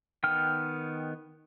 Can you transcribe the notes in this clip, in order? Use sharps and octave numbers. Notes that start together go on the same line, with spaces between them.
D#3 B3 G5 F6